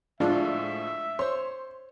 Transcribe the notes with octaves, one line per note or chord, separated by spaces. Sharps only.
A2 F3 G#3 D4 F4 E5
C5 C#5 C6